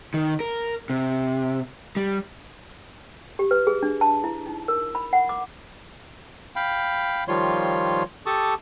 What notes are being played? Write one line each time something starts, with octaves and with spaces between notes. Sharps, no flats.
D#3
A#4
C3
G3
G4
B4
G#4
D4
A5
E4
D#4
A#4
B5
F#5
D6
F5 G5 B5
D#3 F3 G3 F4 C#5 C6
G4 A4 A5 C#6 D#6